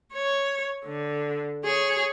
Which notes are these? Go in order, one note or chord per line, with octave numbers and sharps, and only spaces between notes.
C#5
D3
G#4 C#5